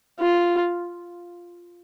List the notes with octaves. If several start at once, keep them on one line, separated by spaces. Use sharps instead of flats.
F4